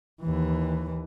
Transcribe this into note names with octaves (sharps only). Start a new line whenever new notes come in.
D#2 E3